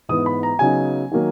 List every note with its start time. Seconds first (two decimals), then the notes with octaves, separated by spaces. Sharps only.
0.09 G#2 E3 B3 D#6
0.26 B5
0.43 A#5
0.59 C#3 F#3 B3 D#4 G#5
1.11 D#3 F#3 A#3